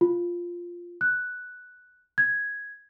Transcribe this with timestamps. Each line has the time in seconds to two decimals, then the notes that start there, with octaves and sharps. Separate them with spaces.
0.01 F4
1.01 F#6
2.18 G#6